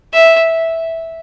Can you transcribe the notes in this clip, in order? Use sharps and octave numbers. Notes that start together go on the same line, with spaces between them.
E5